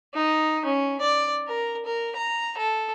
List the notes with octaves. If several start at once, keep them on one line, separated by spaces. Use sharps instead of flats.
D#4
C#4
D5
A#4
A#4
A#5
A4